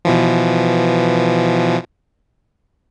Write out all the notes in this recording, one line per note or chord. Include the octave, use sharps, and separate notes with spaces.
B2 E3 F3